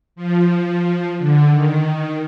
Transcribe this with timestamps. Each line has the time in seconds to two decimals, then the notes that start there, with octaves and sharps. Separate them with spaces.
0.16 F3
1.18 D3
1.52 D#3